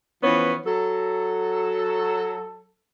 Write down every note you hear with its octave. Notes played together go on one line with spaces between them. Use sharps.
E3 F3 B3 C#4
F#3 A4